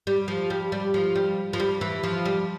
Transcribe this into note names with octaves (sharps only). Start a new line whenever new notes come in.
G3
F3
G3
G3
F3
G3
F3
G3
E3
F3
G3